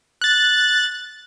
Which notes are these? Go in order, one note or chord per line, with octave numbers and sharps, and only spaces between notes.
F#6 A6